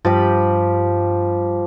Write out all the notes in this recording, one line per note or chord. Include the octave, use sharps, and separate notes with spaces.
G2 F3 G4 B5